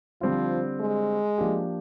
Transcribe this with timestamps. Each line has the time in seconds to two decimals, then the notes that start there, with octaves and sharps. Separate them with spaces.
0.21 D3 F3 G3 C4 F4
0.80 G#3
1.38 F3 A#3 D4 G4